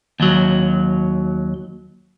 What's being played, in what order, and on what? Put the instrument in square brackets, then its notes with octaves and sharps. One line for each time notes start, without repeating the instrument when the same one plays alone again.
[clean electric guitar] D#2 F#3